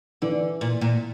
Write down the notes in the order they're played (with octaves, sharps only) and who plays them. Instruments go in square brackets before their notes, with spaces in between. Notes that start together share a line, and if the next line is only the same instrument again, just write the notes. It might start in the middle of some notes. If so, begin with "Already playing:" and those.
[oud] D3 [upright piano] E3
[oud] A#2
A#2